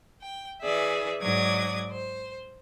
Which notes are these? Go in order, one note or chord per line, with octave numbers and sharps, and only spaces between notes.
G5
E3 G#4 D5 E5
G#2 F#3 D5 D6 D#6 G#6
C5